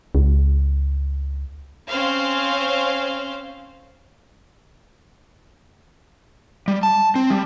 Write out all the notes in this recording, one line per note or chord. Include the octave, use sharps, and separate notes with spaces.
C#2
C4 C#4 C5 F5
G3
A5
C4
G3